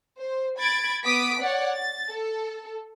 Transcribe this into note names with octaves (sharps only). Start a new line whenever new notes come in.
C5
B5 G#6 A6 D7
B3 D6 D#6 B6 D7
C#5 D5 F#5
A6
A4